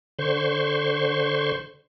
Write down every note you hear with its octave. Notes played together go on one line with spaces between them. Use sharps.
D3 C5 C6 C#6